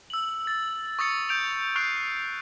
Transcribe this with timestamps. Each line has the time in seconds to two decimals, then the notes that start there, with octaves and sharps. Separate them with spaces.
0.10 E6 F#7
0.47 A6
0.99 C#6 D#6 A6 C#7
1.29 D#6 G6 D7 F7
1.76 C#6 F6 F#6 C7 D7 F7